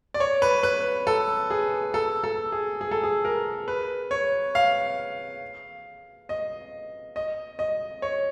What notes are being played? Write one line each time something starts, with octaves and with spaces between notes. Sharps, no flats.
D5
C#5
B4
B4
A4
G#4
A4
A4
G#4
G#4
A4
G#4
A#4
B4
C#5
F5
D#5
D#5
D#5
C#5